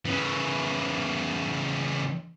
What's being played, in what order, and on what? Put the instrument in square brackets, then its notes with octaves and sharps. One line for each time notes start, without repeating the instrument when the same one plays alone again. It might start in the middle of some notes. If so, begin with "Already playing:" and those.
[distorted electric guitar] C#3 E3